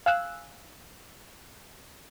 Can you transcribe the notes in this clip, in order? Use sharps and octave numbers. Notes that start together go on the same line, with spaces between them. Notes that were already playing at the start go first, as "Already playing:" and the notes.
F5 G#5 E6 F#6